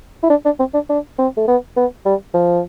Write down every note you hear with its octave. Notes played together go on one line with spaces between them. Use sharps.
E4
D4
D4
C4
D4
D4
C4
A3
B3
B3
G3
F3